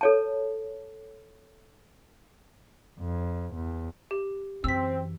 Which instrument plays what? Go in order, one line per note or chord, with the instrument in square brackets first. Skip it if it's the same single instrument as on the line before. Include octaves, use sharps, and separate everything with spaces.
[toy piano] A4 C#5 A5
[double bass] F2
E2
[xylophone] G4
[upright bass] F#2 E3 [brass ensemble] C4 [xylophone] E6 B6